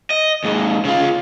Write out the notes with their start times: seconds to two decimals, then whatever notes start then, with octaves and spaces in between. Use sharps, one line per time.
0.10 D#5
0.44 D#2 G#2
0.85 C#3 F4